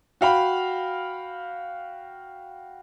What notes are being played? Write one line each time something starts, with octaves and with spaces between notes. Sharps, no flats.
F#4 F5 G5 B5